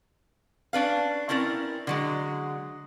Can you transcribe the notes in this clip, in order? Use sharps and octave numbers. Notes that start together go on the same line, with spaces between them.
C#4 D4 B4 F5
C4 C#4 E4 A#4 D5
D3 F#3 G#3